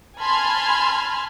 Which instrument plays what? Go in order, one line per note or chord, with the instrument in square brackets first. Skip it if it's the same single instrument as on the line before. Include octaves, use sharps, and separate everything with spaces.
[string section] G#5 A5 B5 C6 F6 G#6